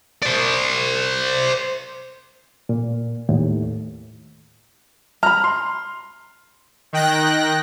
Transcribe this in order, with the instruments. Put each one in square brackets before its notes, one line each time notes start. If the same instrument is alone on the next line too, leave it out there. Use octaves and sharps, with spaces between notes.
[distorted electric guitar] C5 D5
[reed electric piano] A#2
[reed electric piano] D#2 [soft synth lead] A2
[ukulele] A#5 B5 [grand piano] F6
[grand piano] C6
[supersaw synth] D#3 G5 F#6 A#6